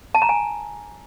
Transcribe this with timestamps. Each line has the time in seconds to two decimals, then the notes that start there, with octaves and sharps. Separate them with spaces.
0.15 A5
0.22 A#5
0.29 G#5